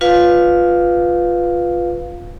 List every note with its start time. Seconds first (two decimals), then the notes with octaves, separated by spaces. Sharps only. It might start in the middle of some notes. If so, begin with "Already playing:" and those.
0.01 F4 B4 F5